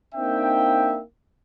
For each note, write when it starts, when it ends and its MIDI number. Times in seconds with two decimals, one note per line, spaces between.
0.15 1.01 58
0.15 1.01 60
0.15 1.01 62
0.15 1.01 63
0.15 1.01 76
0.15 1.01 79